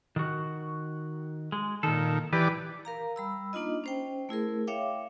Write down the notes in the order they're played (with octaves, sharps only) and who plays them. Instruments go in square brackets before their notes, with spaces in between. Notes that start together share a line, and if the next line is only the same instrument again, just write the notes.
[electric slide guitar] D#3 F#4
G#3
[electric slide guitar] A#2 A4 [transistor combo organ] D#3
[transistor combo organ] E3 G4 D5 [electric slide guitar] B4
[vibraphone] A#4 F5 A#5
G3 B5 E6
A#3 D4 D#4 F4 D#5
C#4 C5 G5
A3 E4 G#4 A#4
C#5 E5 F5 G5 D6